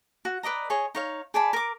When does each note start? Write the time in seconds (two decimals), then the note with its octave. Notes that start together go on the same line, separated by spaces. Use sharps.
0.25 F#4
0.43 B4 D5 D#5 A#5
0.70 G#4 C#5 D#5 G#5
0.95 D#4 C#5 F5
1.34 G#4 D5 A5 B5
1.53 A#4 D6